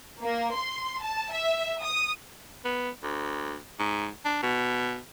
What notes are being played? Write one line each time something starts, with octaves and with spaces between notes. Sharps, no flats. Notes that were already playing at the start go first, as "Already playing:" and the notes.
A#3
C6
A5
E5
D#6
B3
D2
G#2
D4
B2